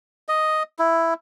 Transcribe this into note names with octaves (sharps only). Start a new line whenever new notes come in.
D#5
E4